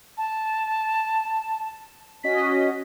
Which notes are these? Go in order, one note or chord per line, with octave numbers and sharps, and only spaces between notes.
A5
C#4 F#4 D#5 B6